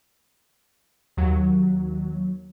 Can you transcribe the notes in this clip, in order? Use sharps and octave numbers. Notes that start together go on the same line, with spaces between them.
D#2 F#3